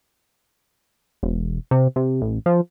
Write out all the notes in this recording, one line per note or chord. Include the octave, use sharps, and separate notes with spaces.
E1
C3
C3
A1
F3